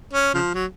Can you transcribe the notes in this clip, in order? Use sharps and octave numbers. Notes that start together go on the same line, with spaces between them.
C#4
C#3 F3
F#3